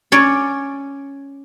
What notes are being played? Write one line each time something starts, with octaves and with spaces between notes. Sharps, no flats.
C#4 C#5 D5